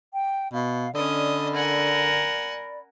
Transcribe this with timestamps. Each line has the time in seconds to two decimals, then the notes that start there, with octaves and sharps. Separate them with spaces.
0.11 G5
0.53 B2 F5
0.94 D3 C#4 D5 D#5 B5
1.55 A#4 F#5 G#5